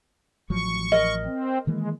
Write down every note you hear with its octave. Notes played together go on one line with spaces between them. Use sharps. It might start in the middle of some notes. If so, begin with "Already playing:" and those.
A1 F3 F#3 C#6
A#4 D#5
C4
D#3 E3 G#3 A#3